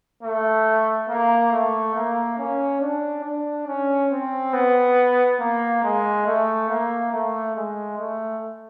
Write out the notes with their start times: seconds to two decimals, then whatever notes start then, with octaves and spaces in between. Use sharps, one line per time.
0.23 A3
1.09 A#3
1.51 A3
1.95 A#3
2.38 C#4
2.81 D4
3.24 D4
3.67 C#4
4.11 C4
4.53 B3
5.40 A#3
5.83 G#3
6.26 A3
6.69 A#3
7.12 A3
7.56 G#3
7.98 A3